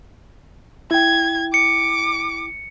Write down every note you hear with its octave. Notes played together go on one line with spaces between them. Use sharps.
E4 G5 G#6
D6 C#7